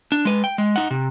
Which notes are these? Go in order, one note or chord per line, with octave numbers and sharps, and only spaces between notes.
D4
G#3 B4
G5
G#3
D#4 F#5
C3